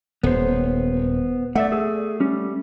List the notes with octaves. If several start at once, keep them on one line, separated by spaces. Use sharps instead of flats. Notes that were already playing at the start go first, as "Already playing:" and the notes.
D#1 B3 C5
A3 D5 E5 F#5
G#4 A4
G3 C#4